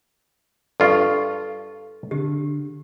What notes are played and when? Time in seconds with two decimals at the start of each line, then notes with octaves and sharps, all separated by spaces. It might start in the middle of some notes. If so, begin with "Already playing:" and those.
0.80 G2 F4 A4 F5 C#6
2.11 D3 G4